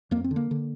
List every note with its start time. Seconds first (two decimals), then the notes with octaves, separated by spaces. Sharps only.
0.11 F2 A#3
0.24 C4
0.31 D3
0.36 A#3
0.51 D3